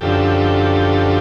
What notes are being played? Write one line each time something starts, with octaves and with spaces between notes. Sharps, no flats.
F#2 D3 F3 G4 A4